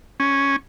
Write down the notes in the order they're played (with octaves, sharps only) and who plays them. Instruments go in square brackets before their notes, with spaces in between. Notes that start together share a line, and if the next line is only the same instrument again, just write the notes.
[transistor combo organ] C#4